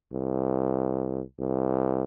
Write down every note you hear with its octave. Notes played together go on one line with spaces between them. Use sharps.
C2
C2